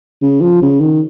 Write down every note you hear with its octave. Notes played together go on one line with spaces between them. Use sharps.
C#3
F3
C#3
D#3